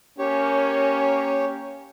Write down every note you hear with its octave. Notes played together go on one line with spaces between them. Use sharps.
A#3 C#4 G4 C#5